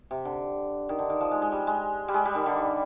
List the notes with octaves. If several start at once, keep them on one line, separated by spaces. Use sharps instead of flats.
C3
D3
D#3
D3
D#3
F3
G#3
G#3
G3
G#3
G3
G#3
G3
D#3
D3